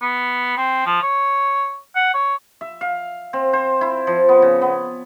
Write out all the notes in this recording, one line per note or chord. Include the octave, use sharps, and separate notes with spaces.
B3
C4
F3
C#5
F#5
C#5
E5
F5
C4
C5
E4
F3
B3
C#3
B3